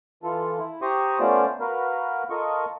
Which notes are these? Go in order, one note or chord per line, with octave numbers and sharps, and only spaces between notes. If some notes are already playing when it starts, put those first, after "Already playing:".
E3 F4 A4
E4
G4 C5 A#5 C6 C#6 D#6
A3 B3 C#4 F4 C5 D5
F#4 A#4 B4 F5
F4 A4 A#4 D#5 C#6